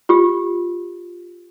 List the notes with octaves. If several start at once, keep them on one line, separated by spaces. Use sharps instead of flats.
F4 G4